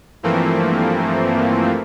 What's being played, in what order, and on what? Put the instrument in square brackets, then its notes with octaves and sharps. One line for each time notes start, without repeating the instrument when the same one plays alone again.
[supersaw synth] G2 E3 F3 A3 A#3 C4